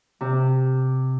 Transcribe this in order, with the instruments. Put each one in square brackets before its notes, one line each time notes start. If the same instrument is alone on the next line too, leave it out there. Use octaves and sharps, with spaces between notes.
[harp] C3